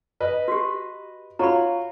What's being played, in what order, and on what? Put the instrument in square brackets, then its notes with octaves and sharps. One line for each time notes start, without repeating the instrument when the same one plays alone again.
[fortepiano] B4 D#5
[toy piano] F#4 G4
[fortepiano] F4 F#4 C#5 [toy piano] A#5 B5